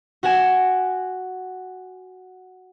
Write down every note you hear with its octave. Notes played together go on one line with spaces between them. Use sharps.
F#4 F#5 G#5 E7